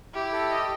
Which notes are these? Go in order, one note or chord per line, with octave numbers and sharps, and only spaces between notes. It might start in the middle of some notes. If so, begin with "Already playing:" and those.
E4 G4
A4
D#5